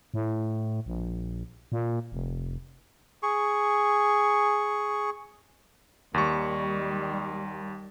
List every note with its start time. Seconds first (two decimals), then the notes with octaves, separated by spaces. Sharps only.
0.14 A2
0.86 A#1
1.72 A#2
2.12 F1
3.23 G#4 C#6
6.14 D#2 D#3 G3 C#6